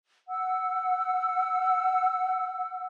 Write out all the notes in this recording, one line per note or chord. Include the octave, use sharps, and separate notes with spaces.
F#5 E6